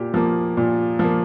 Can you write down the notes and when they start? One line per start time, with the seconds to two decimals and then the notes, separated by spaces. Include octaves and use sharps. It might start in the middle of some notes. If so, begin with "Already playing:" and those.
Already playing: A#2 G4
0.14 F3 A#3
0.57 A#2
0.99 F3 A#3